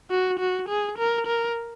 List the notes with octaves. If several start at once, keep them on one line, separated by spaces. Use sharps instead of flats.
F#4
F#4
G#4
A#4
A#4